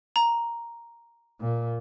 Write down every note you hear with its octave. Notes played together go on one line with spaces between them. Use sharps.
A#5
A#2